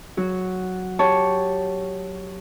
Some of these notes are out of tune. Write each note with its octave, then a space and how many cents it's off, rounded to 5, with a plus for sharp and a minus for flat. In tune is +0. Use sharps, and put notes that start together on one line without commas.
F#3 +0 F#4 +0
G4 +0 C#5 +0 A5 +0